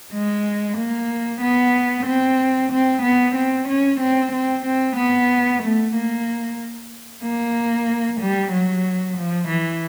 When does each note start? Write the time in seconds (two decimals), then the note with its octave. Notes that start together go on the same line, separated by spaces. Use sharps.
0.12 G#3
0.77 A#3
1.41 B3
2.06 C4
2.71 C4
3.02 B3
3.35 C4
3.67 C#4
4.00 C4
4.32 C4
4.64 C4
4.96 B3
5.61 A3
5.93 A#3
7.22 A#3
8.19 G3
8.51 F#3
9.16 F3
9.48 E3